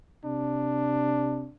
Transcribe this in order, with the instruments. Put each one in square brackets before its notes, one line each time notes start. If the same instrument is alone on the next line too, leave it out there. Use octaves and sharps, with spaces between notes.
[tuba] C3 [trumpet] D4